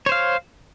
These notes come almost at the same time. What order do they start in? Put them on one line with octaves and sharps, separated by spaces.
C#5 C5 F5